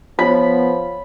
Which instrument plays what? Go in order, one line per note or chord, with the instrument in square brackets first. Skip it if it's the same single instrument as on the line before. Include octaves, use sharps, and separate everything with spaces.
[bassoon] F3 [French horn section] B3 [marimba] C#5 [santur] B5